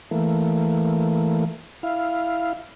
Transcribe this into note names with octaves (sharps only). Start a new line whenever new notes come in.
E3 A3 A#3
E4 F5